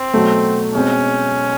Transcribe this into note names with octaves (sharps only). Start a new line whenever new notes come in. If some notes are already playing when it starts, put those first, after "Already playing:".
Already playing: C4
B2 F#3 A3
B2 G#3 C4 C#4